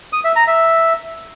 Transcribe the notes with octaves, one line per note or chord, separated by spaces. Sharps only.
D#6
E5
A#5
E5